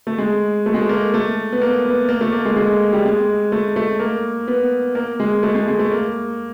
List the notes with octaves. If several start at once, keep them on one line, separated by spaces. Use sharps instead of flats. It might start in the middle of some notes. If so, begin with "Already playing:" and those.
A3
G#3
A3
G#3
A3
A#3
A3
B3
A#3
B3
A#3
A3
A#3
G#3
G#3
G3
G#3
A3
A3
A#3
B3
A#3
G#3
A3
G#3
G#3
A3
A#3